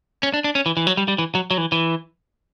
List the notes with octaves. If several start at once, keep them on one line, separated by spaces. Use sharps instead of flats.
C#4
D4
D4
C#4
E3
E3
F#3
G3
G3
E3
F#3
F#3
E3
E3